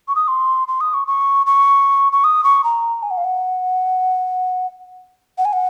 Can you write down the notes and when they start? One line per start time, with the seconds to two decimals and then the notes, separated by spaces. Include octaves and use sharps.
0.08 C#6
0.15 D#6
0.28 C6
0.68 C6
0.81 D#6
0.94 C#6
1.07 C#6
1.46 C#6
2.12 C#6
2.24 D#6
2.44 C#6
2.64 A#5
3.03 G#5
3.11 F#5
3.17 F5
3.24 F#5
5.38 F#5
5.45 G#5
5.53 F#5